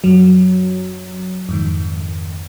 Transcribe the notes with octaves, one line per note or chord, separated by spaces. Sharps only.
F#2 F#3
F2 G#2 D#3